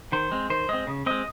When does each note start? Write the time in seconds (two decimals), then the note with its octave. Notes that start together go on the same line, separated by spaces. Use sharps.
0.12 D#3 C5
0.32 G#3 C4
0.50 D#3 C5
0.69 G#3 C4 D#5
0.87 C#3
1.06 G#3 C4 D#5